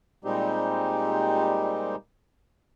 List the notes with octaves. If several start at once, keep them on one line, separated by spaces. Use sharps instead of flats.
A#2 G3 G#3 C4 D#4 G4